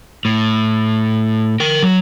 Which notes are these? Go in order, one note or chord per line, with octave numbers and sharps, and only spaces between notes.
A2
A#4 G5
F#3